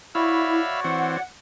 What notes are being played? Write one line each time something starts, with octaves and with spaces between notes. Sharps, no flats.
E4 F#4 C#5 D5 E5 F5 B5
E3 C4 F#5